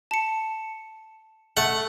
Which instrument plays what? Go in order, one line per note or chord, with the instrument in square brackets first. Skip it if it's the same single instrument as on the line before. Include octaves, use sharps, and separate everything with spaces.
[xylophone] A5 C#7
[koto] A3 [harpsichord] F#5